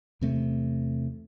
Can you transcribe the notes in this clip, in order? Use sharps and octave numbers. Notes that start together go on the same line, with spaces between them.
E2 C3 A3